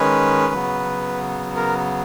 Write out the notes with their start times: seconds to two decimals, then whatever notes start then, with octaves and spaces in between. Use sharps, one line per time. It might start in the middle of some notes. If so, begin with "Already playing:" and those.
Already playing: D#3 G#3 C#4 B4
0.53 C#3 F#3 B3
1.56 A#4